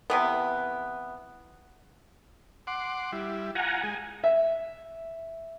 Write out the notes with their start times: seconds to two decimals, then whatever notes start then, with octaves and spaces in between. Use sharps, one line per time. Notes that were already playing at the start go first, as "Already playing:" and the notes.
0.10 C3 E3 B3
2.67 F#5 C6 D6
3.12 G3 E4
3.55 F4 F#5 G#5 A#5
3.83 G#3 G#5
4.24 E5